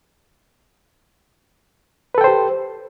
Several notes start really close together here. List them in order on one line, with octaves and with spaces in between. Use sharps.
B4 A4 G5 C5 G4